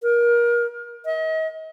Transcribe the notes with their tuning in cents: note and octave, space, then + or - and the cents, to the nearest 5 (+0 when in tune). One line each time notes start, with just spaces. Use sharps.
A#4 +30
D#5 +40